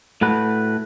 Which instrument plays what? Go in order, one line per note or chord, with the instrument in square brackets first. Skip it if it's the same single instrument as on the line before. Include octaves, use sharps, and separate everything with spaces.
[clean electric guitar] A2 A3 F#4 B4